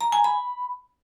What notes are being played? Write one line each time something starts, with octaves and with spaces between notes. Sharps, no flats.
A#5
G#5
B5